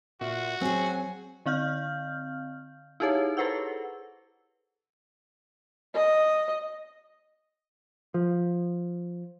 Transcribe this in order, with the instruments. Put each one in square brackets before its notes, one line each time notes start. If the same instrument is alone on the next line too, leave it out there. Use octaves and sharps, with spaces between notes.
[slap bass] A#2 [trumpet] F#4 [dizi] E5
[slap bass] F#3 [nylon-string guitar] C4 G#4 [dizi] G#5
[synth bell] D3 C4 F5 F6 G6
D#4 E4 G4 G#4 C#5
G#4 A4 B4 C5 F#5 E6
[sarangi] D#5
[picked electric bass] F3